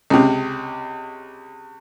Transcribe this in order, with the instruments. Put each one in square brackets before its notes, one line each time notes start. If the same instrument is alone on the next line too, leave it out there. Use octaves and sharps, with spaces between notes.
[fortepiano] C#2 C3